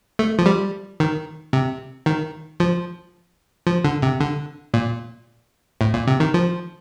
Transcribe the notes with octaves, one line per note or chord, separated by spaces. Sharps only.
A3
F3
G3
D#3
C3
D#3
F3
F3
D3
C3
D3
A#2
A2
A#2
C3
D#3
F3